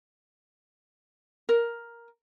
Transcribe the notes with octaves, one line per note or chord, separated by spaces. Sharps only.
A#4